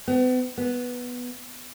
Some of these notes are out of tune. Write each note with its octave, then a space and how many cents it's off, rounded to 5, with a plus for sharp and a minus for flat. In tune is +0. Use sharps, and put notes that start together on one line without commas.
B3 +40
B3 -5